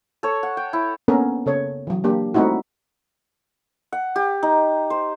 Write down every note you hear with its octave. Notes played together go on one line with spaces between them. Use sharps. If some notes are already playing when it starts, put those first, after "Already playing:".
A4 C#5
F#5
G5
E4
A#3 B3 C#4 D4 A4 A#4
C#3 A4 C#5
E3 F#3
A#3 D4 G4
G3 A3 C4 D#4 E4 F#4
F#5
G4
D#4
C5